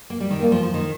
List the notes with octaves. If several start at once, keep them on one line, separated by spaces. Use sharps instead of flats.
A#3
G3
D#3
G3 A#3
F3
F3
D#3